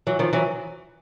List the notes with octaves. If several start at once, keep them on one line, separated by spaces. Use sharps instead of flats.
E3 F#3
D#3 F3
E3 F#3